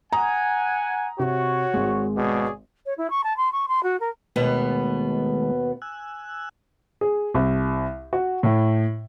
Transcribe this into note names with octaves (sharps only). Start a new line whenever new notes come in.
F#5 G#5 A#5 D#6
C3 F#4 C#5
G#1 G#3
B2 G#4 C#5 D5
C#5
E4
C#6
A5
C6
C#6
C6
F#4
A#4
D#2 B2 D#3 G#3 A3 B3
G#5 E6 F#6
G#4
C2
F#4
A2